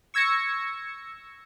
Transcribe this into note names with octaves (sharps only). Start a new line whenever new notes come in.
C#6 E6 G#6 A#6 C#7